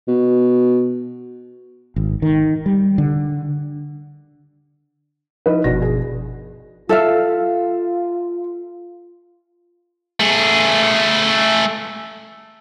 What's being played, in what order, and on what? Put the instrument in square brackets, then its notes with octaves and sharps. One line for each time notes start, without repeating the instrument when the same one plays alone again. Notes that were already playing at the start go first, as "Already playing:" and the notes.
[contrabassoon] B2
[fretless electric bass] G#1
D#3
G3
D3
[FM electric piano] F3 D#4 E4 [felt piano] B4 D#5
[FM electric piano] G1 B2 F3 [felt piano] D4 F#4 A#6
[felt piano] G#4
[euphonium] F4 [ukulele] A4 E5 F5
[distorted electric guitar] A3 G#4